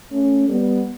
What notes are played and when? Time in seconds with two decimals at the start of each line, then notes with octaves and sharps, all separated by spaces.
0.11 A3 C#4
0.49 G3 B3